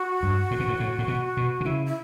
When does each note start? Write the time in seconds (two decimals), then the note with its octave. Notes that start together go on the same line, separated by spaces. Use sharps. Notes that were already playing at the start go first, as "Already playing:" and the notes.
Already playing: F#4
0.23 G2
0.51 A2
0.60 B2
0.68 A2
0.80 A2
0.98 A2
1.08 B2
1.37 B2
1.61 D3
1.65 C#3 E4
1.86 E4